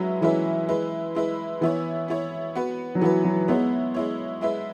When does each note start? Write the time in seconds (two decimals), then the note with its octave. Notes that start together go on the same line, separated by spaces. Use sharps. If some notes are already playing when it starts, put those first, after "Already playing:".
Already playing: F#3 G#3 C#4 E4 B4 E5
0.21 E3 G#3 C#4 E4 B4 E5
0.69 G#3 E4 B4
1.15 G#3 E4 B4
1.61 E3 B3 E4 C#5
2.08 B3 E4 C#5
2.55 B3 F#4 B4
2.95 F#3
3.01 E3 B3 F#4 B4
3.24 F#3
3.48 G#3 B3 E4 C#5
3.94 G#3 E4 C#5
4.41 G#3 E4 B4 E5